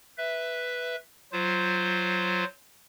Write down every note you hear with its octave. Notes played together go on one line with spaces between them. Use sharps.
B4 E5
F#3 F4 C5